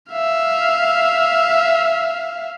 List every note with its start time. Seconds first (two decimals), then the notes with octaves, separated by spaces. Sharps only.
0.11 E5 F5